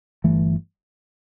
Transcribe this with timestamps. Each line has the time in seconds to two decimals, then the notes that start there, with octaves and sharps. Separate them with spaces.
0.24 G1 G2 E3 A3